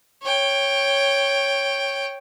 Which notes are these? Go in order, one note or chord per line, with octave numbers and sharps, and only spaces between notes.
C#5 G5